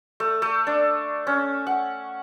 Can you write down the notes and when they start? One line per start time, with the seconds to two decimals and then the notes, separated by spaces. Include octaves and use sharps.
0.20 A3
0.42 A3
0.67 D4
1.27 C#4
1.67 F#5